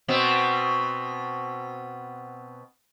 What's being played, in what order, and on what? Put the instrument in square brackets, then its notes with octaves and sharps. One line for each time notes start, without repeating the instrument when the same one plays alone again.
[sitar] B2 B3 C4